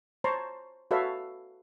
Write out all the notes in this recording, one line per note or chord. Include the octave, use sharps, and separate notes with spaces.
C5 C#5 A5 A#5 C6 C#6
F#4 A4 B4 C#5 E5 F5